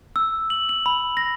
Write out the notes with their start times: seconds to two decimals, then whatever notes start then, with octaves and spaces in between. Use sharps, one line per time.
0.16 E6
0.50 F#7
0.69 F#7
0.86 B5
1.17 A#6